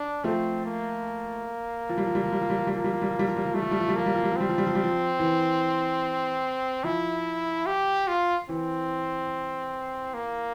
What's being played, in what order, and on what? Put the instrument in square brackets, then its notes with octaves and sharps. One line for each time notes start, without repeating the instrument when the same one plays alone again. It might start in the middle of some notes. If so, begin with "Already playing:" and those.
Already playing: [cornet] D4
[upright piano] F3 A3 [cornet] C4
[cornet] A#3
[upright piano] F3
G3
F3
G3
F3
G3
F3
G3
F3
G3
[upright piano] F3 [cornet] A#3
[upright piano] G3
F3
G3
F3
G3
F3
G3
F3
[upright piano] G3 [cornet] A3
[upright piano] F3
G3
F3
G3
[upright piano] F3 [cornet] A#3
[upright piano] G3
F3
G3
F3
[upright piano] G3 [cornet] C4
[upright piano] F3
G3
F3
G3
F3
E3
[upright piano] F3 [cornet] E4
[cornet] G4
F4
[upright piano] E3 [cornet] C4
[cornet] A#3